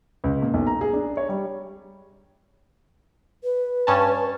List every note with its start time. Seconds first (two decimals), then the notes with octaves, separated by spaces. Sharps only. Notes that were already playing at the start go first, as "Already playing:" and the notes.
0.24 C#2
0.42 A#2
0.54 B1
0.67 A#5
0.81 G#4
0.93 D4
1.17 C#5
1.29 G3
3.44 B4
3.87 G2 C#4 A5